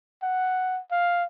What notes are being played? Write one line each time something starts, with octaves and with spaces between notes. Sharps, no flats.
F#5
F5